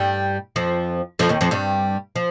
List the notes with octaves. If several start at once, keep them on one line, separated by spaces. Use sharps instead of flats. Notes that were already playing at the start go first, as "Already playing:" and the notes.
Already playing: G2 G3
F2 F3
F2 F3
D#2 D#3
F2 F3
G2 G3
F3